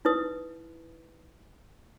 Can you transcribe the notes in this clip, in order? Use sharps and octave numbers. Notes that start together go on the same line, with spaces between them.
D#4 E4 B4 D#6